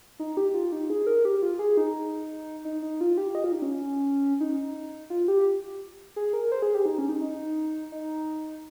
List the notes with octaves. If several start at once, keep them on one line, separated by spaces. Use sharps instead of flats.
D#4
G4
F4
D#4
G#4
A#4
G4
F4
G#4
D#4
D#4
D#4
F4
G4
D#5
F4
D#4
C#4
D#4
F4
G4
G#4
A#4
C5
G#4
G4
D#4
C#4
D#4
D#4
D#4